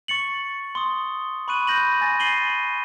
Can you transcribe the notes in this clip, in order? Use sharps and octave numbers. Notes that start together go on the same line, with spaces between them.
C#6 A6 C#7 F#7
C6 D#6
B5 C#6 F#6 D#7 F#7
B5 G6 A#6 D#7 F#7
G#5 A6 A#6
C7 D#7 F#7 G7